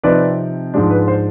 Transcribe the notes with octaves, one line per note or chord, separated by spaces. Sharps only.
C3 F3 C4 D#4 B4 D5
G#2 F3 G#3 D4
B4
C5